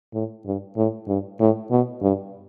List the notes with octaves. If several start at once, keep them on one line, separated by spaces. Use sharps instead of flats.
A2
G2
A2
G2
A2
B2
G2